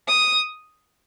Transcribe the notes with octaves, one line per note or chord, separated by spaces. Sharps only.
D#6